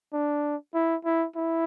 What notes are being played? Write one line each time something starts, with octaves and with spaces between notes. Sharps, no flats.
D4
E4
E4
E4